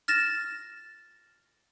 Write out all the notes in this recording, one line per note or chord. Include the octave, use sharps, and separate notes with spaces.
F6 A6 A#6 E7